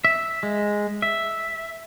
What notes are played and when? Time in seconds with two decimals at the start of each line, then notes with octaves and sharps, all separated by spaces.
0.05 E5
0.43 G#3
1.02 E5